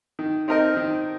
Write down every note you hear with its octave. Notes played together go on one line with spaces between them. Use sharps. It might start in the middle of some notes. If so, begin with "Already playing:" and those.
D#3
C4 D#4 A#4 D#5
D#3